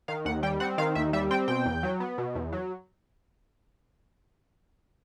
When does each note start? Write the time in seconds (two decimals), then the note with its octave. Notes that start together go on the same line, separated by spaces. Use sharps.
0.08 D#3 F5
0.25 D#2 F#5
0.43 G3 G5
0.60 C4 F#5
0.78 D#3 F5
0.95 D#2 E5
1.13 G3 E5
1.31 C4 G5
1.48 B2 G5
1.66 E2
1.83 F#3
2.00 B3
2.18 B2
2.35 E2
2.53 F#3